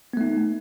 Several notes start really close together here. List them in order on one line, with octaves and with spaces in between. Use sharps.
B3 A3 D#4